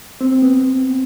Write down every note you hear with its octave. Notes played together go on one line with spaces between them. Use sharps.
C4
C4
B3